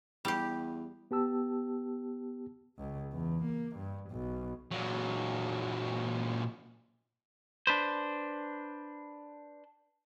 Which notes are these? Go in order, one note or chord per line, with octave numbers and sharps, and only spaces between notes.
E2 G3 G4
B3 G4 A5 E6
C#2
E2
A#3
G2
B1
A#2 F#3
D4 B4 C5